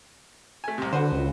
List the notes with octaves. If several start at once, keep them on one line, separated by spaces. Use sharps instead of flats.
A3 G#5
C2 C3
D3 F#4 B4 C5
C#2